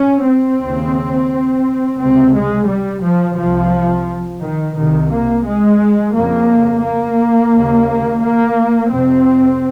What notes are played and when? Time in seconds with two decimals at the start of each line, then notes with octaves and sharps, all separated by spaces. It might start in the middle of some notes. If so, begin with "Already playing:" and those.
Already playing: C#4
0.27 C4
0.61 D#2 C#3
1.99 C#2 C3 C4
2.34 G#3
2.69 G3
3.04 F3
3.38 C2 C3 F3
4.42 D#3
4.76 C2 C3 D#3
5.11 A#3
5.45 G#3
6.14 F2 C#3 A#3
6.83 A#3
7.53 D#2 C#3
8.22 A#3
8.91 F2 C3 C4